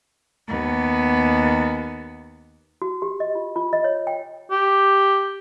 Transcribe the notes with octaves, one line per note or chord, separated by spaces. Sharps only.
D#2 B3
F#4
G4
D#5
F4
F4
D#5
C#5
G5
G4